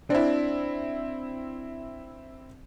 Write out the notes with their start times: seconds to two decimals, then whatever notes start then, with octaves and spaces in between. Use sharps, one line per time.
0.10 C4 D4 E4